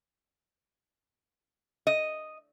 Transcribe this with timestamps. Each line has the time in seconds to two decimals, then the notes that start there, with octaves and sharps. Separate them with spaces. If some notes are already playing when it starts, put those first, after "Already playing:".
1.87 D#5